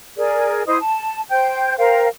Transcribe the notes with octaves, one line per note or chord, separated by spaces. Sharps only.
G#4 A#4 D5
E4 C5 D#5 D#6
A5
C5 G5 G6
A#4 C5 F5 G5